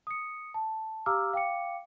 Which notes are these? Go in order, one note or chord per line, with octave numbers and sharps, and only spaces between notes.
D#6 C#7
A5
G4 F5 A#5 D6 E6 F6
F5 G5 D6 C#7